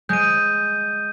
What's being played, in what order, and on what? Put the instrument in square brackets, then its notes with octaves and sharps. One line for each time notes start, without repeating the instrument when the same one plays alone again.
[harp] G#3 [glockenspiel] G6 D#7